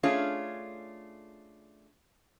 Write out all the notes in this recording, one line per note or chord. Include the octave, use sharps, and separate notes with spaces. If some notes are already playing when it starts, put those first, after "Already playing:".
A3 C#4 D4 F4 G#4 C#5